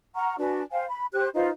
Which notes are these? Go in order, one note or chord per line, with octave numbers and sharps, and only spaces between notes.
F#5 A#5 C#6 F6
D4 F#4 B4 G#5
C5 F5 G5 G#5
B5
G4 C5 F#6
D#4 F4 B4 C5